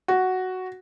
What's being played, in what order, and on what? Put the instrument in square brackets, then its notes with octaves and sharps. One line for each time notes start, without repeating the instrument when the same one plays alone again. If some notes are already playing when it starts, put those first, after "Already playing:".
[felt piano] F#4